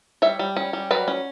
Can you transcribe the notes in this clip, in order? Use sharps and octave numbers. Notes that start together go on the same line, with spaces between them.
G3 C#5 E5
G3
C#4
G3
F#3 B4 D5
C#4